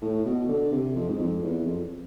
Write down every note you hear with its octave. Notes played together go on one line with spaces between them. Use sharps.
A2
B2
D3
C3
F2
G#2
F2
E2
F2